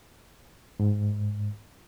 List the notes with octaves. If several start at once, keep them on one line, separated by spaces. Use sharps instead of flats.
G#2